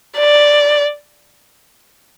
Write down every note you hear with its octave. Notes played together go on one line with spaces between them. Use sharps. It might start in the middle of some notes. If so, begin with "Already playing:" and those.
D5